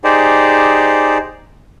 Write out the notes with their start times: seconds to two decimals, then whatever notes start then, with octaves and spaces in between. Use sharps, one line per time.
0.04 D#4 G4 G#4 C5 D5